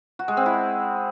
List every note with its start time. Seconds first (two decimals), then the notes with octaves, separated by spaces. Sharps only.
0.19 F#4
0.28 G#3
0.37 C4
0.46 E4